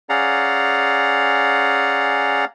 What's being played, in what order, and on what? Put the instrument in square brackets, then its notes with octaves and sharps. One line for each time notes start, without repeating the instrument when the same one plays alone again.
[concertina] C#4 G#4 D5 F5 F#5 A#5